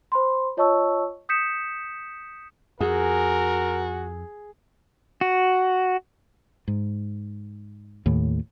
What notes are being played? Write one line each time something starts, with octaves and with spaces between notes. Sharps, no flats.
C5 B5 C6
F4 C#5 D#5 A5 C#6 E6
D#6 G6 B6 C#7 E7
F2 F#4 G#4 A#4
F#4
G#2
D#2 A2